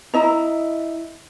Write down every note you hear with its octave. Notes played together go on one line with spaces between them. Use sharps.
E4 D#5 A#5